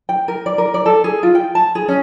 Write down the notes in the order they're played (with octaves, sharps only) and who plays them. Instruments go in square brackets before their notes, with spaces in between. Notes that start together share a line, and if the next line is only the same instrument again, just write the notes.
[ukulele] G5
A#4
D5
A#4
D5
A4
G#4
F4
G5
A5
G#4
C#4